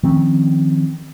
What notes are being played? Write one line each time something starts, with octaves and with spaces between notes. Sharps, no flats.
D#3 F3 C4 C#4